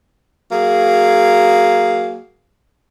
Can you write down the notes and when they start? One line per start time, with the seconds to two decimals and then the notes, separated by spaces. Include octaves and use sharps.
0.51 F#3 A#3 G#4